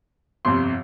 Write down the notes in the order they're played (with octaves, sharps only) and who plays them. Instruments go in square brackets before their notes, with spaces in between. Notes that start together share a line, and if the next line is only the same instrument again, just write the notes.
[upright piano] G1 F2 C3 C6